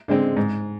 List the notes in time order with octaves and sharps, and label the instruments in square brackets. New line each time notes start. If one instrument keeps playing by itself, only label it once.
[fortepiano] D3 G#3 C4
G#2